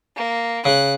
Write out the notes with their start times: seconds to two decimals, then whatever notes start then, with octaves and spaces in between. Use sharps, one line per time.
0.17 A#3
0.65 C#3 F#6